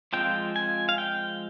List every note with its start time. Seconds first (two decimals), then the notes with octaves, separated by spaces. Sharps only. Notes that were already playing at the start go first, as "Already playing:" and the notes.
0.13 F3 G#3 C4 F4 G5
0.56 G#5
0.89 F5
0.98 G5